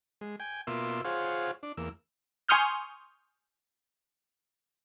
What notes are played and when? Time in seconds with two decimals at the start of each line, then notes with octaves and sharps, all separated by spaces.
0.21 G#3
0.40 G5 G#5
0.67 B2 A#3 F4 E5 C6 E6
1.05 F4 G#4 C5 C#5 F5 F#5
1.63 D4
1.77 E2 A#3 E6
2.48 G#5 C6 C#6 D#6 F6 G6